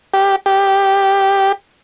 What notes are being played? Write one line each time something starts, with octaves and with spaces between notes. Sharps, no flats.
G4
G4